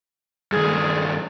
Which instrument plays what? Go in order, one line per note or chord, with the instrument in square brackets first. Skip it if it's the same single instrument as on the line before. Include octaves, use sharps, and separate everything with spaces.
[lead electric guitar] G2 D#3 [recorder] G#4